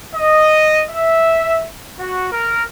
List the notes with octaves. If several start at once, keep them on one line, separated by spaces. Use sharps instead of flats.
D#5
E5
F#4
A#4